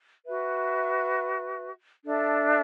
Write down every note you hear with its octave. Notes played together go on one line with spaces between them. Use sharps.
F#4 B4 E5
D4 A4 E5